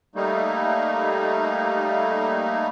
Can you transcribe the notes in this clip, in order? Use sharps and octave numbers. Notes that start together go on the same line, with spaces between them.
G3 A3 A#3 D#4